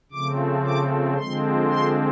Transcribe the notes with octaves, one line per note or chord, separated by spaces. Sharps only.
C#3 F3 A3 C4 D6
D6
D3 F3 G#3 C4 C6
C6